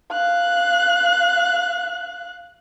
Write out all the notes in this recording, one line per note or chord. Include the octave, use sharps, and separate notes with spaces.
F5 F#6